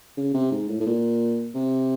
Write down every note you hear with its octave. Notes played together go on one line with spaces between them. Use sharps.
C#3
C3
G#2
A2
A2
A#2
C3